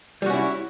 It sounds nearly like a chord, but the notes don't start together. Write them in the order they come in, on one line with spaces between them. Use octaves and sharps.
G3 F#4 C#4 E4